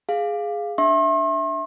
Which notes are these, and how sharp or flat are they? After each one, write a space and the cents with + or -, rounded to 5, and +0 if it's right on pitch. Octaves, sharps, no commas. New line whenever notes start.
G#4 +0 F5 +0
D4 +0 E5 +0 C6 +45